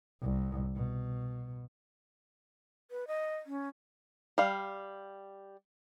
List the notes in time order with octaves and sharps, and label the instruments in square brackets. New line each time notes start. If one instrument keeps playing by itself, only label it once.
[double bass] C2
B2
[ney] B4
D#5
C#4
[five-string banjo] G3 F5